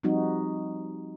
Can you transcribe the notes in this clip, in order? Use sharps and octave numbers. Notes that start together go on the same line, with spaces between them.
F3 G3 C4 D#4 F#4